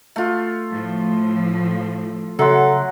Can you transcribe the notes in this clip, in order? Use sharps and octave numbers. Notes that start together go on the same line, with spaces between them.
A3 F4
A2 F3
C#3 F#3 A4 E5 F#5 C6